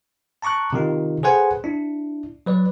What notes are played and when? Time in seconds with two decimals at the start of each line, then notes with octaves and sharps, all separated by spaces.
0.42 A5 A#5 C#6 D6 F#6
0.73 C3 D#3 D#4 F4
1.23 G#4 A4 B4 C5 F#5 G#5
1.64 D4 E4
2.46 F#3 B4 D5